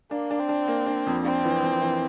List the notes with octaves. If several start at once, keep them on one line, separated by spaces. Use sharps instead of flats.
A#3 D4
D4
C4
D4
A#3
D4
F2
C4 D4
E3
F2
E3